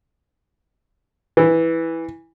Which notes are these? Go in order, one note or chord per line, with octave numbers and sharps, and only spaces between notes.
E3